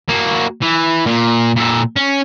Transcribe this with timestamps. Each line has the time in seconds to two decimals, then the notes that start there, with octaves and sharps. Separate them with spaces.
0.09 A#3 F#4
0.62 E3
1.06 A#2
1.56 A#2 A4
1.96 C#4